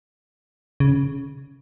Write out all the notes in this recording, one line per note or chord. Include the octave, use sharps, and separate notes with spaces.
C#3